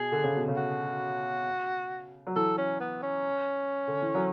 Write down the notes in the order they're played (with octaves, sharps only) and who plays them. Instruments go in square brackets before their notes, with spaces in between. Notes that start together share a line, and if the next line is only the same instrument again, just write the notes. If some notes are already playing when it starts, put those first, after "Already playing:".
Already playing: [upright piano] B2 [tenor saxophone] G#4
[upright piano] D3
C#3
B2
C#3
[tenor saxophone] F#4
[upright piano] F#3
[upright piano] E3 [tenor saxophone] A4
[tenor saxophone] C#4
B3
C#4
[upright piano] D3
E3
F#3